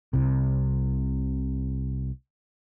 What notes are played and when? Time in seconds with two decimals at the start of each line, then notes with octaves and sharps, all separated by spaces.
0.13 C2 C3